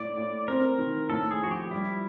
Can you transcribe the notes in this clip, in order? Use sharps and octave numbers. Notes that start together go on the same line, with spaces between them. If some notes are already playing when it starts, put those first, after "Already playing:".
Already playing: A2 D5
A2
C4 A#4
D#3
A2 A4
G#4
F3 F#4
G4
G3 E4